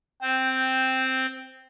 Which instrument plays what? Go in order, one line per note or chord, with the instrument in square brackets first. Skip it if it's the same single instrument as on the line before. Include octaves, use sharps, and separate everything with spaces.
[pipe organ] C4 C5 [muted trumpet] G5